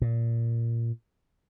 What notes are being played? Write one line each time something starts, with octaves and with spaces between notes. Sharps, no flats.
A#2